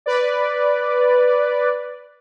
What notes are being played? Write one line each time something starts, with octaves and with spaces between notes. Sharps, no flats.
B4 D5